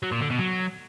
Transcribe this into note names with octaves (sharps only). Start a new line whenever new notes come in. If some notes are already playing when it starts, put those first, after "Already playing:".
F#3
A#2
D3
B2
F#3